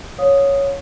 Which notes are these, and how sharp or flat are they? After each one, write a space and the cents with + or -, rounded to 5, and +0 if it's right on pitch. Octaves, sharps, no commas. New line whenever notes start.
C#5 +0 F5 +35 D#6 +0